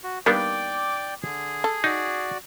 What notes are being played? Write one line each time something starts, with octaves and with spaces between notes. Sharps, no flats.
F#4
D#3 G3 A#3 B3 D4 D5 G5 D6
D3 G#4
A4
D#4 F#4 D5